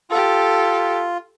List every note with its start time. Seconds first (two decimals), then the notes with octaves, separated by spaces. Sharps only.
0.10 F4 G4 A4